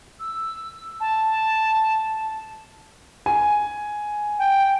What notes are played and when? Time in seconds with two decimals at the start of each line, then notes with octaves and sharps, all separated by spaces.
0.20 E6
1.00 A5
3.26 G#5
4.39 G5